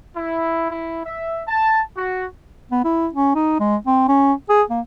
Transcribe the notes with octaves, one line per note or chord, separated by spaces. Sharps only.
E4
E4
E5
A5
F#4
B3
E4
C#4
D#4
G#3
C4
C#4
G#4
A#3